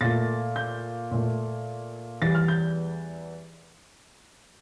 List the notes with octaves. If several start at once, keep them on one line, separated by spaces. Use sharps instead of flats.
A#2 A3 A6
G6
A#2 A3
E2 E3 G3 A6
F6
G6